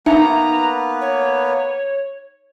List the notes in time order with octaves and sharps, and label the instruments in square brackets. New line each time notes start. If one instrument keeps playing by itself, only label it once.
[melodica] A#3 B3 B4 [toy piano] D#4 [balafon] E5 [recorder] A#5
[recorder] C#5